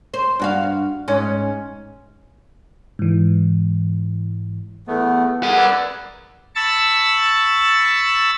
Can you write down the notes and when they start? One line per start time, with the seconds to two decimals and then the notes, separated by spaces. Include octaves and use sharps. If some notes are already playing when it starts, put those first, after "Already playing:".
0.14 C5
0.40 G2 F#4 F5
1.08 G#2 C#4
2.99 G#2 E3
4.87 E2 A3 B3
5.43 G#4 A#4 F#5
5.57 B4 D5 E6
6.55 A5 B5 C#6 E6 A6